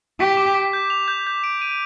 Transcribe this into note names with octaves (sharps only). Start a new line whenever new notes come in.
G4 B6
D6
D6
G6
F7
G6
G6
D7
D#7